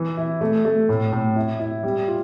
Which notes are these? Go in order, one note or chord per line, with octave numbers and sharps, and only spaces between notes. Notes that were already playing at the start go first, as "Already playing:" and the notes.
Already playing: E3
E4
A3
A3
A2
A2
E4
E4
G3
F4